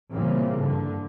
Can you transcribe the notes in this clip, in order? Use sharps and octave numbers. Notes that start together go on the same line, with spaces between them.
A#2 C#3 E3 G3 A#3 C4
G2 D3